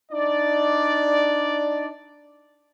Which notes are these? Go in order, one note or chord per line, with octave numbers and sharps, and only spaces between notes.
D4 D#4 D5